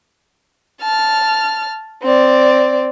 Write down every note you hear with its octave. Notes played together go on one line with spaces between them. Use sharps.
A5 F6
C4 D5